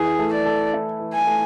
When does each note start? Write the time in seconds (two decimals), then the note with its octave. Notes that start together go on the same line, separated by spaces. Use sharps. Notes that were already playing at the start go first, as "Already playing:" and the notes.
Already playing: E3 G#4
0.19 A3
0.33 D5
0.45 A4
0.74 E4
1.00 E3
1.14 G#5
1.27 A3